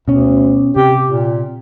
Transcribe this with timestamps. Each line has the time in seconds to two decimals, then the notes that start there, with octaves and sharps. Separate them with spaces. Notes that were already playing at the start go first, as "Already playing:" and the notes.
0.08 D2 B2 C#4
0.76 C3 G4
1.07 A#2